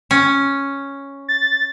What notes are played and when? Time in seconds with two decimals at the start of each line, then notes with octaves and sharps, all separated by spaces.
0.11 C#4
1.28 A6